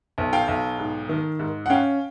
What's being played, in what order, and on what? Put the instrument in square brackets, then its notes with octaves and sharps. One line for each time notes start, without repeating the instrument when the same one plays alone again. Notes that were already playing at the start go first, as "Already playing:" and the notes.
[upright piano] B1
F5 G5
B1
G#2
D#3
G#2
F#5
C#4 F5 G5